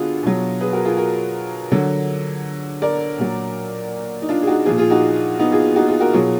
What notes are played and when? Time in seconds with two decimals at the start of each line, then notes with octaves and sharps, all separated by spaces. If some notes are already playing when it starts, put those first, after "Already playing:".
Already playing: D3 B3 D4 F4 F#4 G#4
0.23 B2 F#3
0.61 G#4 B4
0.73 F#4 A#4
0.84 F4 G#4
0.98 F#4 A#4
1.72 D3 F#3
2.82 A#4 D5
3.18 A#2 F#3
4.22 D#4
4.29 D4 F4
4.42 G#4
4.47 D#4 F#4
4.65 A#2 F3 F4 G#4
4.78 F4 G#4
4.90 D#4 F#4
5.39 B3 D#4
5.52 F4 G#4
5.76 D#4 F#4
5.88 F4 G#4
6.00 F#4 A#4
6.13 B2 F#3 F4 G#4